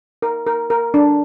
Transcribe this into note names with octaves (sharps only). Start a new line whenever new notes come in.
A#4
A#4
A#4
D4